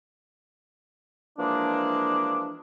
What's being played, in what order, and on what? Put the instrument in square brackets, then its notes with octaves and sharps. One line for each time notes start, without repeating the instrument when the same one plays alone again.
[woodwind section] E3 F3 G#3 A#3 D4